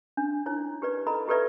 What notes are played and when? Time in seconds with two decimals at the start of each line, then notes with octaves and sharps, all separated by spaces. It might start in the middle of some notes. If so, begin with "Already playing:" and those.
0.17 D4
0.46 D#4 E4 C#5
0.82 G4 B4 D5
1.06 E4 A4 D#5 A#5 B5
1.28 F4 G4 A4 B4 D5 E5